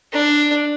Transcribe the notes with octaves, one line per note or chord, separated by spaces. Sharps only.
D4